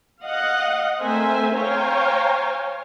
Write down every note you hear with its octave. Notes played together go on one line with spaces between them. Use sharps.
D#5 F5 F#5
A3 C4 A#4 C5 E5 G#5
C5 C#5 F5 G5 G#5 A#5